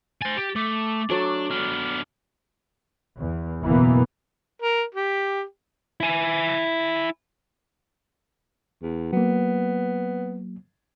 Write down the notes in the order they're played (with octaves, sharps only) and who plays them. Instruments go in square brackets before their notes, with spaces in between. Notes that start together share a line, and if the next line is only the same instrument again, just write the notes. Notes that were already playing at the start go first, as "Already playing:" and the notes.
[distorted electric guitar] C5 G#5 [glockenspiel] A6
[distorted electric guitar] G4
[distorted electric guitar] A3 [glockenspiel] D6
[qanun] F#3 A3 [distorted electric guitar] D4
[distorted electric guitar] B3 D4 [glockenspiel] F6
[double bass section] E2
F#1 B2 E3 A#3 B3
[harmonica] A#4
G4
[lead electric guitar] E4 G#5
[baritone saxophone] E2
[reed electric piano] F#3 A#3 [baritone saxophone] B3